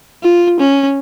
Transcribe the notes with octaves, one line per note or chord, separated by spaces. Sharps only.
F4
C#4